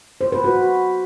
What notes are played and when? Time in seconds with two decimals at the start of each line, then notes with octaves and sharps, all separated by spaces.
0.21 C5
0.32 B4
0.44 F#4